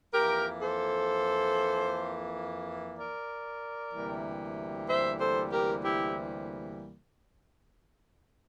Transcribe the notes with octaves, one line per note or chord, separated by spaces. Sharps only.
F2 E3 A#3 G4 A#4
A4 C5
A#4 D5
D2 C3 E3 G3 A#3
C5 E5
A4 C5
G4 A#4
E4 G4